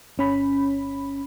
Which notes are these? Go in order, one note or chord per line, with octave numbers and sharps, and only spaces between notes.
G1 C#4 B5